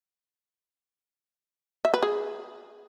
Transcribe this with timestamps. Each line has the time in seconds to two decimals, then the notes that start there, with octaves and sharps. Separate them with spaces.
1.85 E5
1.94 B4
2.03 G#4